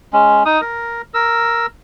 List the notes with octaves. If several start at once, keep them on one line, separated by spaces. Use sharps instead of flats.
G#3 C#4
D#4 D#6
A#4
A#4 E6